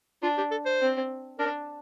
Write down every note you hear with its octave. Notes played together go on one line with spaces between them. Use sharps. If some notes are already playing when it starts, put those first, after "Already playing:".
D4 F4
G4
A4
C5
C4
D4 A#4